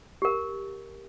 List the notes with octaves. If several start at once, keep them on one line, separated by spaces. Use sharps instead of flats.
G4 A#4